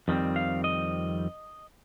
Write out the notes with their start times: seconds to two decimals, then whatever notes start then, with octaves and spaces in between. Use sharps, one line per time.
0.08 F2 D#3 G3 C4
0.36 F5
0.64 D#5